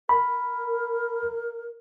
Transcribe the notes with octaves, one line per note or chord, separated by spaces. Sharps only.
A#4 B5